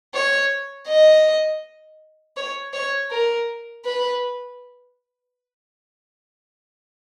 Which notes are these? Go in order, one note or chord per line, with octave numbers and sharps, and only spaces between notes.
C#5
D#5
C#5
C#5
A#4
B4